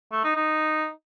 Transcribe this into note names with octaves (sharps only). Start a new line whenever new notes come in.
A3
D#4
D#4